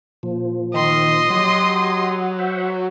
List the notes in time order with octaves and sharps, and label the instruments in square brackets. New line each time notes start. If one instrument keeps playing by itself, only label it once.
[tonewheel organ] A#2 F3
[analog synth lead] D#3 [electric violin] D#5 C6
[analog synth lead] F#3 [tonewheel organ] G4
[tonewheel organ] C5 E5 F#5